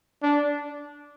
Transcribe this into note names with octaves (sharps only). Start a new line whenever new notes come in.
D4